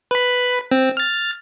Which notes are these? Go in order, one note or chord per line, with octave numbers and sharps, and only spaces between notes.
B4 B5
C4
F6 A6